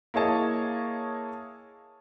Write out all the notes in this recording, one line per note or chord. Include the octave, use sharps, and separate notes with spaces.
A#3 E4 G#4 C#5 D#5 A5